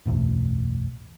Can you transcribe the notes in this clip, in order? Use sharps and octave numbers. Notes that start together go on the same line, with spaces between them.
F#1 B1 E2 A2